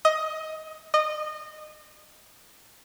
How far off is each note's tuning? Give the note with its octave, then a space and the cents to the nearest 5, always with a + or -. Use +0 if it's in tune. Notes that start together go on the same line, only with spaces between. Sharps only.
D#5 +15
D#5 -20